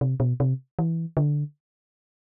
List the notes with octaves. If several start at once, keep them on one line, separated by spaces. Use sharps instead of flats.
C3
B2
C3
E3
D3